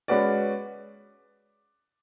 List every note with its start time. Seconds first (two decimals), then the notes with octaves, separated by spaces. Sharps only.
0.08 G#3 C#4 F#4 B4 D5